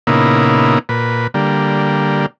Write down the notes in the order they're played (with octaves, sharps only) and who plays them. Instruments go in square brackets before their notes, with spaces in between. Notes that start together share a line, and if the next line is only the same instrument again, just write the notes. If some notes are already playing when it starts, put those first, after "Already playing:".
[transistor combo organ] A#2 C#3 A#3 B3 D#4 E4
A#2 B4
D3 G3 A#3